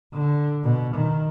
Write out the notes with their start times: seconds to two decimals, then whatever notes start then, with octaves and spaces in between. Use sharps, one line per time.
0.13 D3
0.64 B2
0.95 D#3